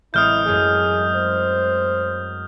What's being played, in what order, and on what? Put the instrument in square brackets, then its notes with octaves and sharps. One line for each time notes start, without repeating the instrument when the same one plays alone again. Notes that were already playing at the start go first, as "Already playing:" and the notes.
[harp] A1 G#3 C4 [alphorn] E4 [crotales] D#6 F6 G6
[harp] F#2 G#3 A3 [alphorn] G#4
[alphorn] C5